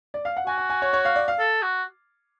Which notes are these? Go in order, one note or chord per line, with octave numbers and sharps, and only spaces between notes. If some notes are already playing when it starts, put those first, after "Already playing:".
D5
F5
F#5
F#4 G#5
G#5
G#5
C#5
C#5
F5
D5
F5
A4
F#4